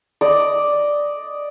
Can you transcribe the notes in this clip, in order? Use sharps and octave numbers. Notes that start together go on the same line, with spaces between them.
D5 D#5